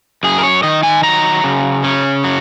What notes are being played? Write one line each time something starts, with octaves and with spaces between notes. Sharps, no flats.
F#2 G#4
A#4
C#5
D#3 D#5
G#5
F#3 A#5
C#3
C#4
F#3